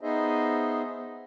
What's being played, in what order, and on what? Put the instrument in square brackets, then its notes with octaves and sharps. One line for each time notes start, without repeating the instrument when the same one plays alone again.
[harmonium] B3 D#4 G#4 C5 D#5 E5